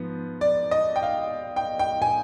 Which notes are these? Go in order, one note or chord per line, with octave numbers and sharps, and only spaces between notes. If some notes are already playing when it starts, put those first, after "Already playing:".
Already playing: G#2 F3 B3
D5
D#5
G5
F5
G5
G5
G#5